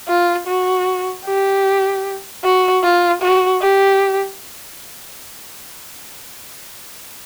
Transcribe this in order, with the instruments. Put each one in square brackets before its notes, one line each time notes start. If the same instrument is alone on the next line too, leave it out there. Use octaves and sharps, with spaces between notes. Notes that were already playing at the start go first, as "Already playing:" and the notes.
[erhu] F4
F#4
G4
F#4
F4
F#4
G4